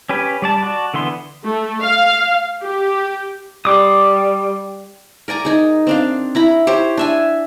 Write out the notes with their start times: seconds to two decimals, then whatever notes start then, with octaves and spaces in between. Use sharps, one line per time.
0.09 C#4 G4 B4
0.42 G3 D5 A5
0.62 F#4 D5 A5
0.94 D3 E3 B3 C6
1.44 A3
1.82 F5
2.61 G4
3.65 G3 C6 D6 D#6
5.28 A#4 D5 G#5 A#5
5.45 D#4 G#4
5.87 C4 D4 F5
6.35 E4 A#5 B5
6.67 G4 C5 C#5
6.97 D4 E5 G#5